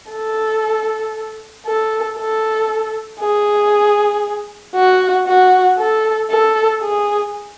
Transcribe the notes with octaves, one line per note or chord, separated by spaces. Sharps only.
A4
A4
A4
G#4
F#4
F#4
A4
A4
G#4